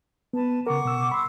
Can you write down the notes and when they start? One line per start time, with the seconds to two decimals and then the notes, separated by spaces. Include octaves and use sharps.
0.33 B3 B4 A5
0.67 C#3 A#4 F#5 C#6 D6
0.85 B2 E6
1.11 B5 C6 E6